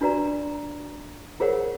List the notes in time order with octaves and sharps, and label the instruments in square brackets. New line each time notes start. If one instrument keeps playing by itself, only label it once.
[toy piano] D4 F4 F#4 B4 D5 A#5
F4 G#4 A#4 C5 C#5 F#5